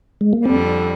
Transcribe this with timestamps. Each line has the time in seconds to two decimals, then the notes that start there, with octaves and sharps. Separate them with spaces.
0.21 G#3
0.33 A#3
0.45 F2 D3 G3 C4